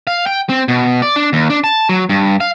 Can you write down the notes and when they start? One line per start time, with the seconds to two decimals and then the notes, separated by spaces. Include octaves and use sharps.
0.07 F5
0.26 G5
0.49 C4
0.68 B2
1.02 D5
1.16 D4
1.33 D#2
1.50 D4
1.64 A5
1.89 F#3
2.09 G2
2.40 F5